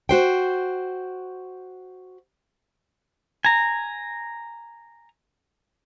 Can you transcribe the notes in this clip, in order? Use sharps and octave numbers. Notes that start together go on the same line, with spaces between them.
F#4 C5 G5
G#5 A#5